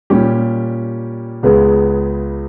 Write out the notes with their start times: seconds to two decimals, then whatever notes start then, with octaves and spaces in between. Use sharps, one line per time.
0.10 A#2 G3 C#4 G4
1.43 C#2 C#3 G#3 B3